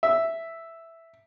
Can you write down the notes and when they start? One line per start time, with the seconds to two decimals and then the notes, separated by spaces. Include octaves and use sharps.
0.03 E5